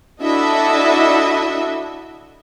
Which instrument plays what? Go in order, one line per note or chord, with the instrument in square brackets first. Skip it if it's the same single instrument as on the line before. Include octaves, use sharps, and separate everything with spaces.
[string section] D4 E4 F#4 A4 D#5 E5